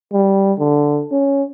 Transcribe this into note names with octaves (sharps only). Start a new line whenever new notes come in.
G3
D3
C#4